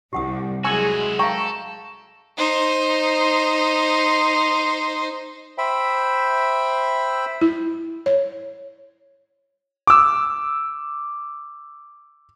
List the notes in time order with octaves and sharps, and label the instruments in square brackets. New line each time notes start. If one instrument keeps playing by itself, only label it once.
[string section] C2 [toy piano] G4 F#5 D#6
[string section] F#3 G#3 [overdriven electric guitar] E4 F#4 [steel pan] G#5 C#6 E6
[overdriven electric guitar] A4 [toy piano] F5 C#6 [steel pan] G5 A#5
[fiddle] D#4 C5
[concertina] C5 E5 G5 B5
[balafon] E4
C#5
[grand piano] D6 E6